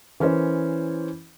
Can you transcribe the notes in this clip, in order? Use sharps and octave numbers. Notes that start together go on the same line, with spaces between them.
E3 C#4 A#4 C5